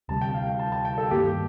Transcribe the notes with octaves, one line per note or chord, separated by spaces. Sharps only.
D2 C3 G3 A5
G5
F5
G5
A5
A5
G5
A4
G2 D#3 G3 A#3 G4